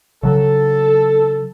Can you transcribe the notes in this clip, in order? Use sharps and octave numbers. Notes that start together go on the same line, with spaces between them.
C#3 F#3 A4